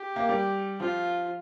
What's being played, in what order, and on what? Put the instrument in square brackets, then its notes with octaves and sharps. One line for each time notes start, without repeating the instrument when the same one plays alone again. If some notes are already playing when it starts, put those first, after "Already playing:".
Already playing: [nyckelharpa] G4
[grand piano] A#3
G3
[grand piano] F3 [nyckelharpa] F4